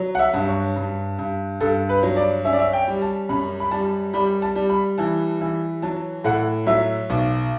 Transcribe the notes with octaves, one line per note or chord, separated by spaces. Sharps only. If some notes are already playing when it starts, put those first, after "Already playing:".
Already playing: F#3
F#5
E5
G2
C#5
G2
G2
G2 A4
B4
F#3
D5
C#4 E5
D5
E5
G5
G3
A5
F#2 B5
B5
G3 A5
G3 B5
A5
G3
B5
E3 A5
E3
F#3 A5
A2 F#5
F#3 E5
B1